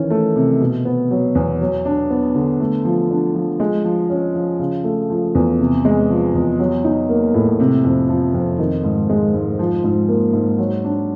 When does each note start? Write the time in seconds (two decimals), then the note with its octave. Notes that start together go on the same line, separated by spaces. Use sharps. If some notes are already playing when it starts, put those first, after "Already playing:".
Already playing: D#3 E3 C#4
0.10 A3
0.36 C3
0.61 B2
0.85 B3
1.11 F#3
1.35 E2
1.61 F#3
1.85 D4
2.10 B3
2.35 D3
2.60 A3
2.85 F3
3.10 D4
3.35 F3
3.60 G#3
3.84 F3
4.10 C#4
4.35 F3
4.59 C#3
4.84 A3
5.10 F3
5.35 E2
5.59 C3
5.85 G#3
6.10 F3
6.34 E2
6.59 F#3
6.84 D#4
7.09 A#3
7.34 A2
7.60 C3
7.84 F2
8.09 F3
8.34 F2
8.59 D#3
8.84 G#2
9.10 G#3
9.34 G#2
9.59 F3
9.84 G#2
10.09 A#3
10.33 G#2
10.58 F#3
10.84 D4